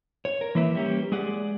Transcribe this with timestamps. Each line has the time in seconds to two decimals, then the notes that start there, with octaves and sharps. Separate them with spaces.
0.25 C#5
0.41 A#4
0.55 E3 A#3 B4 E5
0.75 G3 A#3 C#4 G4
1.12 G#3 G#4 D5 F#5